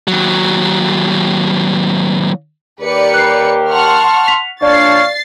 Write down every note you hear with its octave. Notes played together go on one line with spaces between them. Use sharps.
D#2 F#3
D#2 G4 A#4 B4 D5 C#7
F#6 C7
F#5 A5 C6 C#6 F6
B6 F7
A#2 D4 C#5 D5 F5 C#6 A6 C7